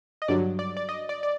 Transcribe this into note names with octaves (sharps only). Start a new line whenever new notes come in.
D#5
G2 D3 F#3 D5
D5
D5
D#5
D5
D5